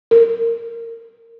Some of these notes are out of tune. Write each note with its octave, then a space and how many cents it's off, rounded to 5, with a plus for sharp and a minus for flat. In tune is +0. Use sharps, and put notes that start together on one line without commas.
A#4 -15